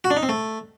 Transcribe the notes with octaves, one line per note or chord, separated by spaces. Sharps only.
F#4
D4
D#4
C4
A3